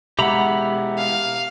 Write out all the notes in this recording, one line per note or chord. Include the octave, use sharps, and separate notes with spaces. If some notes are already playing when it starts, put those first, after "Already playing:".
B2 G#3 G4 E5 F#5 A#5 B5
F5